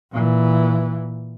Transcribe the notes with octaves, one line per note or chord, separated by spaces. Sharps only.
A#2 E3